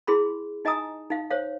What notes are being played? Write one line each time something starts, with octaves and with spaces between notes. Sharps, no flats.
E4 G#4 B5 C6
D#4 D#5 G#5 A#5 D#6
D#4 F5
C5 C#5 F5